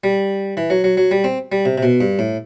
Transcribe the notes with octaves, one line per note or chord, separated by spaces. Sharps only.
G3
E3
F#3
F#3
F#3
G3
C4
G3
C3
C3
B2
G2
A2